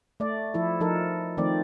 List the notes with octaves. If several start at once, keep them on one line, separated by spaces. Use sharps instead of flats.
A3 D5
F3 E4 A4
F3 D#4 A4 A#4
D#3 F3 A3 C4 D5